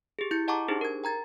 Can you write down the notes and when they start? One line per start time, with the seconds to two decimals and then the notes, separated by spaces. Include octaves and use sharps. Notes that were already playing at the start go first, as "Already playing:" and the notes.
0.19 G4 G#4
0.31 E4 G6 A6 C#7
0.48 D#5 F#5 A5 A#5 C#6 D6
0.68 D4 D#4 G4 G#4 C5
0.81 A#4 G#6
1.04 G5 A#5 G#6 A6